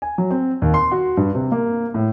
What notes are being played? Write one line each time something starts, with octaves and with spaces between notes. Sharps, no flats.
G#5
F#3
C4
D#2
C6
F#4
G2
C3
A#3
A2